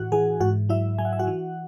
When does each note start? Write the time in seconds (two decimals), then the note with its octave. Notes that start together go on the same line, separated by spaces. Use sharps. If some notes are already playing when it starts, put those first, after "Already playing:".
Already playing: A2 E3 F#4 F#5
0.12 E3 G#4 G#5
0.40 G#2 F#4 F#5
0.69 F#3 E4 E5
0.98 F#3 G#5
1.05 F#5
1.13 E5
1.19 F#4 F#5
1.27 E3